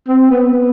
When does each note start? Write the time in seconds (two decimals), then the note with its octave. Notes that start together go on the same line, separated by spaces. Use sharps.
0.08 C4
0.30 B3
0.53 B3